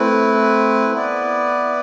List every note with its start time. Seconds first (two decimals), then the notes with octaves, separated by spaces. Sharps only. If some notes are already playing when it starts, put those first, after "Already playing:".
Already playing: A3 C4 E4 B4
0.94 B3 E4 B4 D5